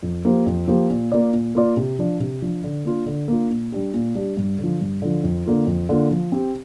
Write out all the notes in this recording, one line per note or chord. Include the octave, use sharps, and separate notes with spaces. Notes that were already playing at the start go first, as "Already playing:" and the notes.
F2
F3 A#3 G4 C5
F2
F3 A#3 G4 C5
A#2
A#3 F4 D5
A#2
A#3 F4 D5
C3
F3 D4
C3
F3 D4
D3
A#3 D4 F4
D3
A#3 D4 F4
A#2
G3 D4 G4
A#2
G3 D4 G4
G2
D3
F3
G2
D3 F3
F2
D3 A#3 F4
F2
D3 A#3 F4
F3
C4 G4